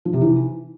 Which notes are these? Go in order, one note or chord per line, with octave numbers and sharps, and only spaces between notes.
F3
C3
E3